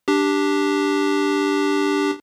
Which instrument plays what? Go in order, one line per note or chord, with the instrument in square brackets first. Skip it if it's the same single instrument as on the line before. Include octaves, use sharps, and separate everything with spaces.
[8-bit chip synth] D4 G4